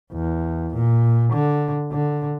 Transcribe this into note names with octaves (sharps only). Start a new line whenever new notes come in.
E2
A#2
D3
D3